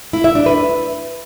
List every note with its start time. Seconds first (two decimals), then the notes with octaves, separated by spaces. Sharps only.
0.13 E4
0.24 E5
0.35 D4
0.46 B4